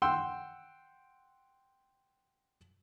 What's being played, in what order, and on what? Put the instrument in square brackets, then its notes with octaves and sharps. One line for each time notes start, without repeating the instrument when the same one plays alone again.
[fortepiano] F#5 G5 C6 E6